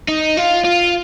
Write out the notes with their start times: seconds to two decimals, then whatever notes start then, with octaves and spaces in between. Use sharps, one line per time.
0.08 D#4
0.37 F4
0.65 F4